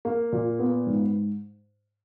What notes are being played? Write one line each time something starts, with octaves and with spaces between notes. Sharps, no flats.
A#3
A#2
B3
G#2